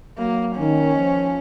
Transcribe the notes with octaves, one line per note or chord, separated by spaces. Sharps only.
F#3 A#3
D#3 C#4
F3